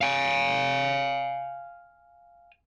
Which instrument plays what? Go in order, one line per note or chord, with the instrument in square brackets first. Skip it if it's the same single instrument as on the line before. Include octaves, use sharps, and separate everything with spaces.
[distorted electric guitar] F5 G#5